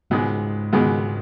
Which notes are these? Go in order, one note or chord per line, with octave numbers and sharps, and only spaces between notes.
C#2 G#2 B2 G#3
C#2 B2 G#3